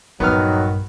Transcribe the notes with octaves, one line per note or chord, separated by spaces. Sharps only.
A#1 G2 D#3 F#3 B3 F6